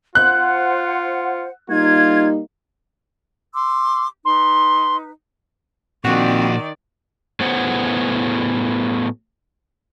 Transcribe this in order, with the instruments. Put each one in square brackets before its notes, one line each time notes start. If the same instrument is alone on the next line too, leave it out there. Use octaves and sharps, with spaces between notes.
[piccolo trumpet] F4 [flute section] C5 F#5 [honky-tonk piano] F#6
[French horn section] G3 A#3 D#4 [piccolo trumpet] F4 [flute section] G#6
[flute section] C6 D6 E6
[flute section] D#4 B4 [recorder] C6
[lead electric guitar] A#2 F3 [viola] D#3 D5 [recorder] C4 [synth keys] F#4
[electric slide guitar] A2 F#3 B3 G#4 C5 F#5